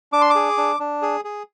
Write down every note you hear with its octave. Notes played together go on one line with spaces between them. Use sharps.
D4 D6
C6
G#4 D6
D4
D4
G#4
G#4